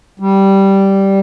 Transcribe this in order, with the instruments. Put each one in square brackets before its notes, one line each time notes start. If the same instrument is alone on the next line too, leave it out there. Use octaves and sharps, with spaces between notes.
[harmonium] G3